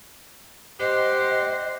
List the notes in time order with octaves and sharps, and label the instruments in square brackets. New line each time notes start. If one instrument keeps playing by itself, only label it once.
[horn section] G4 [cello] C5 [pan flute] D#5 [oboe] F#5